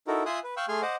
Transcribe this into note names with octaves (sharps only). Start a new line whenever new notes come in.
D#4 E4 F#4 A4 A#4
F4 E5 G#5 C6 D#6 F#6
B4
F5 G5 C#6 E6 F#6
A3 G#4 G#5 C6 F6
C5 D#5 F#5 D6